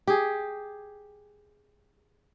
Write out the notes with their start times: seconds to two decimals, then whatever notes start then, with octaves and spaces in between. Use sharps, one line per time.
0.07 G4 G#4